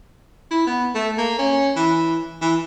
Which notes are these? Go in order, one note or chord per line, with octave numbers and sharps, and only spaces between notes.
E4
B3
A3
A#3
C#4
E3
E3